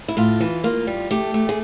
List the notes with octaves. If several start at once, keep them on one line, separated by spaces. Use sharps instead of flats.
E4
A2 F4
E3
A#3 F4
G3
A3 G4
A3
G#4